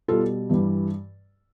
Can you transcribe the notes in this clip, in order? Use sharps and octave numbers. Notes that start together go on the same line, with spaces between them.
B2 G3 F4 A4
G2 E3 G3